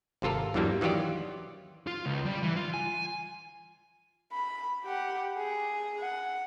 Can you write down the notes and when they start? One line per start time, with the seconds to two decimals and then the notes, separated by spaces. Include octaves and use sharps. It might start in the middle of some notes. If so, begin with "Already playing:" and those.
0.22 G#1 C3 F4 A4 A#4
0.54 E2 G2 E3 F#3 G3 A#3
0.81 D#3 E3 F#3 F4 G4 D5
1.87 F4
2.06 C#2
2.26 G3
2.43 E3
2.56 F4
2.74 G#5
4.32 B5
4.84 G4 F#5
5.37 G#4
6.00 F#5